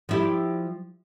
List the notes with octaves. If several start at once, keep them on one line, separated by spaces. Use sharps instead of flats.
F3 E4 G4